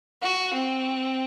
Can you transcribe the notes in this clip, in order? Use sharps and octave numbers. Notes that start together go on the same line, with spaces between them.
F#4
C4